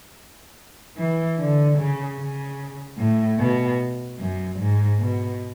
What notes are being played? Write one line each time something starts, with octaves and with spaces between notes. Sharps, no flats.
E3
D3
C#3
C#3
A2
B2
F#2
G#2
B2